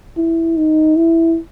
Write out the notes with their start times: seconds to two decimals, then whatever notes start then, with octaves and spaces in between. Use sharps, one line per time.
0.17 E4
0.57 D#4
0.97 E4